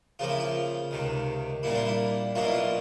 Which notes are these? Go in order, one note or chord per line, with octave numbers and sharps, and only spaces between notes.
C#3 F3 A#3 F4
E4
F4
C#2 C3 D#3
A#2 G3 A#3 D4 E4
F4
E4
B2 F#3 A#3 D4 F4
E4
F4